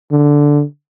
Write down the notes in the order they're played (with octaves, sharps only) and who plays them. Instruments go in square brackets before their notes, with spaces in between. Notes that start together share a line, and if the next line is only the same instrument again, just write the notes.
[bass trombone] D3